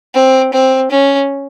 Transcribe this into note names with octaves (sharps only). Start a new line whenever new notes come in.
C4
C4
C#4